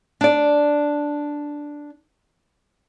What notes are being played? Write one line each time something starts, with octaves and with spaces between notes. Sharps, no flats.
D4 D5